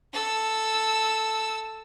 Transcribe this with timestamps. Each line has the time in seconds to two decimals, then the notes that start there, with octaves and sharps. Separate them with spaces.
0.13 A4 E6